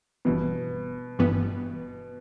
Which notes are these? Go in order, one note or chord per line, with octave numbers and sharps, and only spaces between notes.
G1 G2 B2 E3 B3
G1 G2 E3 B3